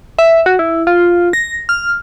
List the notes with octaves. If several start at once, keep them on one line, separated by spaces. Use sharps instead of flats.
E5
F#4
E4
F4
A#6
F6